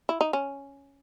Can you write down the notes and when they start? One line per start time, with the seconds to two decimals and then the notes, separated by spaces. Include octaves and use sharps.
0.09 E4
0.21 D#4
0.33 C#4